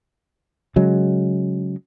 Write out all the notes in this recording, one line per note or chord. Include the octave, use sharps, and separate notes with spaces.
C#3 F#3 G#3